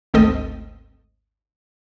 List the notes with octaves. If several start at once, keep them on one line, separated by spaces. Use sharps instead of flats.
G#1 D2 A3 C4 A4 D#5